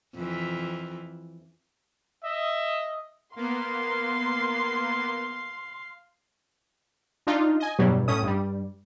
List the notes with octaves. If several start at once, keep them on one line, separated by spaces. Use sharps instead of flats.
F2 E3
D#5 E5
A#3 B3 F5 C6
D4 D#4 F4
D#5 G#5
E2 G2 B2 F#3 G3
A2 C#4 D#6
G2 G3